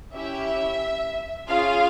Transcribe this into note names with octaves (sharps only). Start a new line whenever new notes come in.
C#4 E4 G4 E5
C#4 F4 G#4 F5